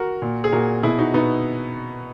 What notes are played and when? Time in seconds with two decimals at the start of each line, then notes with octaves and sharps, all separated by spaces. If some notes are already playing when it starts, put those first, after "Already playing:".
Already playing: F#4 A#4
0.22 A#2
0.44 G#4
0.52 A#2 F#4 A#4
0.83 B2 E4 G#4
0.99 D#4 F#4
1.14 B2 B3 D#4